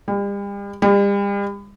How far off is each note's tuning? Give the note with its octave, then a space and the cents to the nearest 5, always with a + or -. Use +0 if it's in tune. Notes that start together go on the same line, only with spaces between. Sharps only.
G3 +40
G3 +40